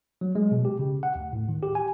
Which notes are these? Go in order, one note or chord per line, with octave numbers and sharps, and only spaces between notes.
F#3
G#3
B2
G4
C#3
F#5
D2
A2
D#3
G4
G#5